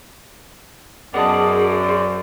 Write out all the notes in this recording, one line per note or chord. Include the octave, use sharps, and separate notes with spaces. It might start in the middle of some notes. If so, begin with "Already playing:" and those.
F#2 B3 G#4 D5 D#5 A5
C5